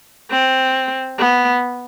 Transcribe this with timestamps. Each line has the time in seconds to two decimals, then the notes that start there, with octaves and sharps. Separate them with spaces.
0.31 C4
1.18 B3